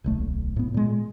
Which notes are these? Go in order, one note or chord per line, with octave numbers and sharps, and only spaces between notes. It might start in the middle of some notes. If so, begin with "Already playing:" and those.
D1 B1 A3
A2 B3
A#2 G#3